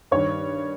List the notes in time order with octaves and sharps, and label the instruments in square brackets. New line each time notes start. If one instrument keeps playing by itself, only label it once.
[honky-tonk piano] G2 D#3 C#5